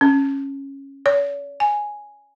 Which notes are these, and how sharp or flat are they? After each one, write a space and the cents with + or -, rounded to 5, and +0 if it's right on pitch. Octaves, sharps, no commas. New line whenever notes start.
C#4 -10
C#5 +45
G#5 +0